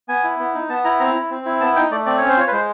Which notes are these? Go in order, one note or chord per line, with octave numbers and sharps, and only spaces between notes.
B3 G#5
E4
B3
D#4
B3 A5
E4 A#5
C4 A#5
E4
C4
E4
B3 A5
D#4 G5
A3 D5
C4 D5
C#4 C#5
C5
F4 C#5
B4
G#3 C5